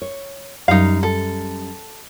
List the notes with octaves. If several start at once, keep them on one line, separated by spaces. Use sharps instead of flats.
C#5
F#2 G3 D#4 F5
A4